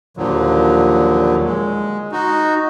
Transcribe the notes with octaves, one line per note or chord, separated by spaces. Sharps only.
D#2 A#2 D3 F3 F#3
G#3
D#4 F#4